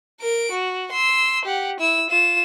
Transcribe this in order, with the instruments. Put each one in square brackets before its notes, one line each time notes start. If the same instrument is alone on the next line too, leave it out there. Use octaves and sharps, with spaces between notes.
[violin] A#4 D7
F#4
C6 E6
G4 F#5
E4 E6
F4 E7